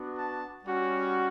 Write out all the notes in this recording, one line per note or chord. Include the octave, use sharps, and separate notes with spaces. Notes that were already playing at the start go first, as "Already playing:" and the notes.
Already playing: B3 D4 F#4
A5
G3 C#4 F#4